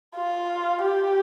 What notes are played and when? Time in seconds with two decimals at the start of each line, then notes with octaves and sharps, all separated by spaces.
0.16 F4
0.83 G4